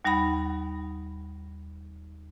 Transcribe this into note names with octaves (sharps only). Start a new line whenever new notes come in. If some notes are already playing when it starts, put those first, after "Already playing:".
D#2 G3 D#4 F#5 B5